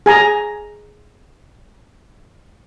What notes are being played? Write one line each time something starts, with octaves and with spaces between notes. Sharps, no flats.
G#4 G#5 A#5